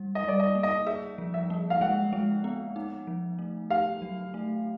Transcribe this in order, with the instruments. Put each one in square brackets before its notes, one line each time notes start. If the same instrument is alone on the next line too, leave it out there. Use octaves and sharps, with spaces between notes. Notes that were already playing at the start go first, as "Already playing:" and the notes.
Already playing: [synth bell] G3
[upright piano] D#5
[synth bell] G3 [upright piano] D5
[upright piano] D#5
[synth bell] A#3
[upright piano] D#5
[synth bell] G#4 [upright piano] E5
[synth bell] F3
[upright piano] E5
[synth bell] A#3
[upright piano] F5
[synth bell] G#3 [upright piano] F#5
[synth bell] G#3
B3
D#4
F3
A3
[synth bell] G4 [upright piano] F5
[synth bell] F#3
A3